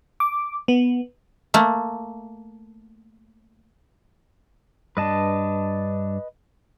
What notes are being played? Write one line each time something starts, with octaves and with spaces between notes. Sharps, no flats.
D6
B3
A3 A#3
G2 D4 B4 D#5 A5